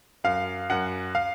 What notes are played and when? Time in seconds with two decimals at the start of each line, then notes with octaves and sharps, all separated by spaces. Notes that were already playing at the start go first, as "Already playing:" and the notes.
0.24 F#2 F5
0.70 F#2 F#5
1.15 F5